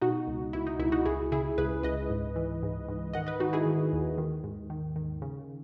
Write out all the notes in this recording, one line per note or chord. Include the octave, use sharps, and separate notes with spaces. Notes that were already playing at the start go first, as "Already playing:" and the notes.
B2 D#4 F#4
C#2
C#2 E4
D#4
C#2 E4
D#4 F#4
C#2 E4 G#4
C#3 E4 G#4
C#2 G#4 B4
C#2 B4 D#5
G#2
E3
G#2
G#2
D#3 D#5 F#5
B4 D#5
D#3 D#4 F#4
E4 G#4
D#3
D#2
D#3
G#2
D#3
D#3
C#3